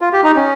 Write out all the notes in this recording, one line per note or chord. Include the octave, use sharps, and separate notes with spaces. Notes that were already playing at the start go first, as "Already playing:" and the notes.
F4
G4
D#4
C#4